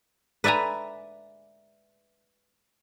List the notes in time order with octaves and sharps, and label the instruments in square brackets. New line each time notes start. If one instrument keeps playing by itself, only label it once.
[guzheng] B4 D5 E5 G#5 A#5